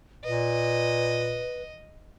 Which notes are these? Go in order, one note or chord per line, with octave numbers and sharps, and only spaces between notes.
A#2 B4 D#5